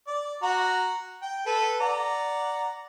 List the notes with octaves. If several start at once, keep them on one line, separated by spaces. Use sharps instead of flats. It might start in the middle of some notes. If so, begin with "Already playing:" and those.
D5
F#4 A#5
G5
A4 B4
D5 F#5 A#5